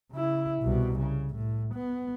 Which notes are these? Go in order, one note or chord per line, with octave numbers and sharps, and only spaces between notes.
C#3 E4
C2 B2
C#3
A2
B3